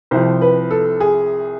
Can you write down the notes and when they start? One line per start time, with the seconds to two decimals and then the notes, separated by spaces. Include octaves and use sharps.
0.11 C2 C3 F3 C5
0.41 B4
0.71 A4
1.00 G#4